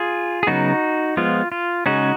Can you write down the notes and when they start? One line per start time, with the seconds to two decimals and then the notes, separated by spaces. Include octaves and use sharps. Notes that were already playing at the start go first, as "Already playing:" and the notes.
Already playing: F4 G#4
0.43 G#4
0.47 C#3 F#3 B3 D#4 F#4
1.17 F3 G#3 B3 F4
1.52 F4
1.86 C#3 G#3 C#4 D#4 F#4